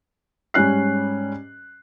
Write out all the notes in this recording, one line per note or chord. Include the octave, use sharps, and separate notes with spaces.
G#2 G3 C#4 F#6 C7